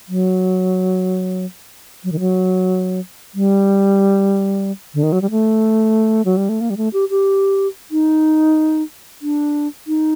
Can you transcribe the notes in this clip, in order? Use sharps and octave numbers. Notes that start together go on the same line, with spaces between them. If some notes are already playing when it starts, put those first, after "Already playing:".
F#3
F#3
D#3
F#3
G3
D3
D#3
F#3
G3
A3
F#3
G3
A3
A#3
G3
A3
G4
G4
D#4
D4
D#4